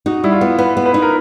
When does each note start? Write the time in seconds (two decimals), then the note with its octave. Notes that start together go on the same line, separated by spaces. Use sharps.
0.06 D#4 F#4
0.24 G3 E4
0.32 F4
0.41 B3
0.58 B3 B4
0.77 B3
0.86 B4
0.94 D#4
1.02 A#4